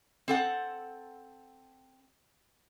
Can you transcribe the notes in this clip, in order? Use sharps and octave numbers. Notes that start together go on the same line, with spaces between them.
C4 A4 F#5